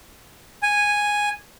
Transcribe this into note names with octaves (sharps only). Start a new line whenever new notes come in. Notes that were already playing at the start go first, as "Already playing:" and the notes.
G#5